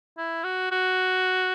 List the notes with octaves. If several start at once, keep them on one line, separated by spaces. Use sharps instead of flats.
E4
F#4
F#4